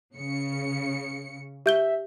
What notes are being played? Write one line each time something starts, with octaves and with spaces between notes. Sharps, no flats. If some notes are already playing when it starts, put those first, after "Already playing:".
C#3 C#7
G4 E5 G6 G7